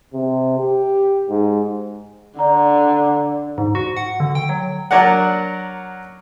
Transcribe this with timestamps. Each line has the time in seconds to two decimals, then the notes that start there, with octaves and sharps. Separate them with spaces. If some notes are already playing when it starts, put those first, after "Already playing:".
0.14 C3
0.58 G4
1.29 G#2
2.39 D3 D5 A#5
3.58 G#2
3.75 F#4
3.97 F#5
4.20 D3
4.35 G5
4.49 F#3
4.91 F#3 D4 A#4 D5 F#5